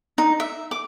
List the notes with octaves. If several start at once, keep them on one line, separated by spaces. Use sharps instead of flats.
D#4
E5
D6